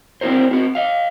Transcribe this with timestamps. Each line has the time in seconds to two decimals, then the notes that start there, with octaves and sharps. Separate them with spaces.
0.21 C4 D4 E4 F#4 A#4 C5
0.49 C4 F4 F#4
0.75 D#5 F5